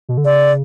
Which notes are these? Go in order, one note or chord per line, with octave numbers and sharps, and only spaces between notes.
B2
D3
C#3 D5